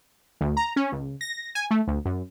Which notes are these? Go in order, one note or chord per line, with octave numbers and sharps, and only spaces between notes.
D2
A#5
C#4
C#2
A#6
G#5
A3
D2
F#2